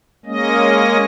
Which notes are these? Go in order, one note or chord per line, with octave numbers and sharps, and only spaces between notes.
G#3 A#3 C#4 D#5